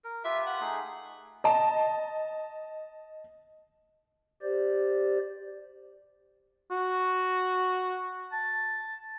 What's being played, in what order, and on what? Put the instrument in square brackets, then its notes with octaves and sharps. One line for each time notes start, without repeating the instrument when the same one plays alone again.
[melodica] A#4
[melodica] F4 G4 B4 [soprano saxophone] E5
[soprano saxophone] F#5
[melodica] A3 D#4 G#4
[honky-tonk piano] D#5 A5
[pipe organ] G4 C5 D5
[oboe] F#4
A5